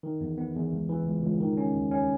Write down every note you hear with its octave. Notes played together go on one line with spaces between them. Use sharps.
D#3
E2
B3
E2
C#2
E3
C#2
C#2
D#3
C#4
D#2
C#4